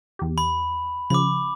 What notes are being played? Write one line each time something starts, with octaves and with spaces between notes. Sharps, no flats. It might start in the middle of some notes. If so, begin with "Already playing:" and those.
E2 G4
B5
C#3 F3 B5 D6